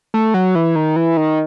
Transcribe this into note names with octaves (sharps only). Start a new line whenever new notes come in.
A3
F#3
E3
D#3
E3
D#3